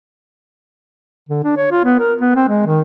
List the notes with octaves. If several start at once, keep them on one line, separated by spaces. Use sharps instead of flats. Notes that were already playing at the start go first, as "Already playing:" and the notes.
D3
D4
C#5
F4
B3
A#4
B3
C4
G#3
D#3